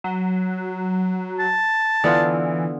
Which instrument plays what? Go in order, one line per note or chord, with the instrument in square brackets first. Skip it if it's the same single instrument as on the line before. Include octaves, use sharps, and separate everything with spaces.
[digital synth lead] F#3
[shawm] A5
[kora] D3 B3 F4 [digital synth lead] E3